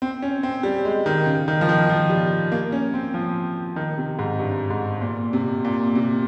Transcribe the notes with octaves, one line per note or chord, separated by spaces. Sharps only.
C4
C#4
C4
G3
G#3
D#3
C#3
D#3
F3
D#3
F3
G3
A#3
C#4
C4
F3
D#3
C3
G#2
G2
G#2
A#2
C3
A#2
C3